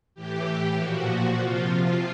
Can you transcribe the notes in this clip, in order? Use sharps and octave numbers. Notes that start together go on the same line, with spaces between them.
A2 E3 G4
A#2 F3 F#4
C3 F3 F4